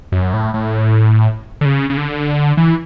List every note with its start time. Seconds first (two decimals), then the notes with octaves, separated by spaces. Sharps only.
0.12 F#2
0.34 A2
0.54 A2
1.61 D3
1.65 C#3
1.90 C#3
1.97 D3
2.57 E3